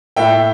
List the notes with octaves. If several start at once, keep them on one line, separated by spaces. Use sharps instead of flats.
A2 E5 G5